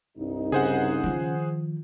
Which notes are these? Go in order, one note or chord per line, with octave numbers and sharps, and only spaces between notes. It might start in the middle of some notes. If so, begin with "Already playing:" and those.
C2 G2 D#4
C#3 G#4 C5 F#5
D#3 F3